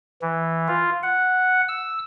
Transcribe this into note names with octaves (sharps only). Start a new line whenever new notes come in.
E3
F4
F#5
E6